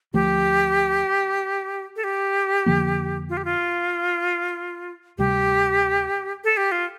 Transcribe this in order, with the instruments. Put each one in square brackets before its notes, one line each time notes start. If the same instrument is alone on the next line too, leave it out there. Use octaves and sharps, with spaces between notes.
[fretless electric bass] D2 D3 F3 A3 [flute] G4
[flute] A4
G4
[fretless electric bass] F2 D3 F3 A#3
[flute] F4
G4
F4
[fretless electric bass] D2 C3 G3 [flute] G4
[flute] A4
G4
F4